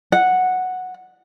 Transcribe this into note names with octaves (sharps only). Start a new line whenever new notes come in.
F#5